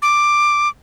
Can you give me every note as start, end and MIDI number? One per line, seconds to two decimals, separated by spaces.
0.02 0.68 86